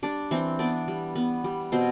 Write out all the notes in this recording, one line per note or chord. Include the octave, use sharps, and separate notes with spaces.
G3 D4 D5
E3 C4 C5
B3 D4 D5
G3
B3
G3
B2 C4 C5